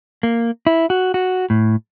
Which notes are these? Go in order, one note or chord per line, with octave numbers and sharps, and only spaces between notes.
A#3
E4
F#4
F#4
A2